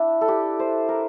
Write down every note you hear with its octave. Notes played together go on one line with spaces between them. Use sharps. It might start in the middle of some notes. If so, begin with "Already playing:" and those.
Already playing: D4 E4
A4
G4
C5
A#4